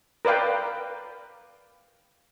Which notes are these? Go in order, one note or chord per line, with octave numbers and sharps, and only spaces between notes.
A#4 B4 D5 F5 G5